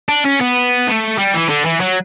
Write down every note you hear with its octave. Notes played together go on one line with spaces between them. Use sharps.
D4
C#4
B3
A3
G3
E3
D3
E3
F#3